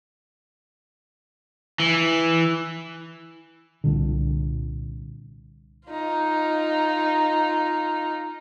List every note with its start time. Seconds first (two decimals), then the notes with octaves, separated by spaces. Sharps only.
1.80 E3
3.84 C2 A#2 D3
5.88 D#4 F4